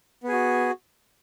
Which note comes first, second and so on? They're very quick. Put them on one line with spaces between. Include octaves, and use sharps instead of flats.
B3 G#4 F#4